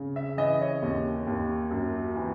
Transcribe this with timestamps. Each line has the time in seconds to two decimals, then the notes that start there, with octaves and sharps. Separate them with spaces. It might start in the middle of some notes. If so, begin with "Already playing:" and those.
Already playing: C#3
0.16 E5
0.37 E3 D#5
0.61 C#5
0.82 D#2
1.27 D#2
1.71 F#2
2.16 E3